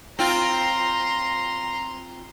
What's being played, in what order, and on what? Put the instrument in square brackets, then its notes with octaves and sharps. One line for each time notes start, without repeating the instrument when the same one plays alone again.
[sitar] C4 F4 [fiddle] A#5 C6